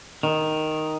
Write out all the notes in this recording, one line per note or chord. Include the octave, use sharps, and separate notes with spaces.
D#3